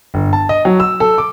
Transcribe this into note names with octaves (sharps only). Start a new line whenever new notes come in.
G1
A5
D#5
F#3
E6
A4
D6